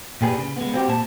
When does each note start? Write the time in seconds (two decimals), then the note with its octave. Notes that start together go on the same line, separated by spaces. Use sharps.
0.21 A#2 G4 G#4 B4
0.38 C#3
0.56 G#3 B3
0.74 C4 F#4 G4
0.88 A#2 A5